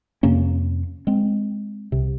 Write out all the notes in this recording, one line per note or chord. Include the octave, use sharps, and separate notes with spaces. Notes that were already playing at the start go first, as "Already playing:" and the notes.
F2 C3 A#3 C#4
G#3 C4
C2 C3